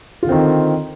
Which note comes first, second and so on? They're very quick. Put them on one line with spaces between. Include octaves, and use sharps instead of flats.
F4 D3 C4 D#3